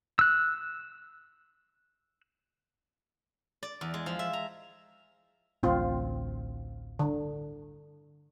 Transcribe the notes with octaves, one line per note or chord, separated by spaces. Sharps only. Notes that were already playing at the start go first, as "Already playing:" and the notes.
E6 F#6
D5
E2
G#3
F3
E5
A#5
A1 D2 C4 F4
D3